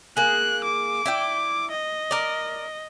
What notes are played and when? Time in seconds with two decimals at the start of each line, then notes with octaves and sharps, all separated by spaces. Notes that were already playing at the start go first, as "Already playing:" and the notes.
0.17 A#3 G#4 F#6
0.64 D6
1.06 E4 D5 G5
1.71 D#5
2.11 A#4 D5